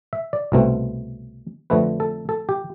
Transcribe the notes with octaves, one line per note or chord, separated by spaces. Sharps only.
E5
D5
C2 B2 A3 C4
F2 D3 A3 C4 B4
A4
A4
G4